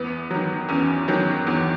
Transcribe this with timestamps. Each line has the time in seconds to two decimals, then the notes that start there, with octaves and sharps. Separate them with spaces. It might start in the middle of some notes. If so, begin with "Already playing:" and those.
Already playing: E2 B3
0.31 D#3 F#3
0.69 E2 C#4
1.08 D#3 F#3
1.47 E2